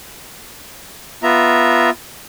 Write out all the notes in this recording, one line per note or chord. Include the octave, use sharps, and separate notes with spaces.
B3 F4 E5 A#5